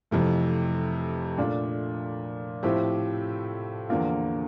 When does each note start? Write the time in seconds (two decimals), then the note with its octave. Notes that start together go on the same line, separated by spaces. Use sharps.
0.11 F2 C3 E3 A3
1.37 A#2 A3 D4 F4
2.63 A2 F3 C4 E4 G4
3.89 E2 D3 F3 A#3 F4